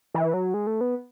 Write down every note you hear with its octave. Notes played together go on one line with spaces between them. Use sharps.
E3
F#3
G#3
A3
B3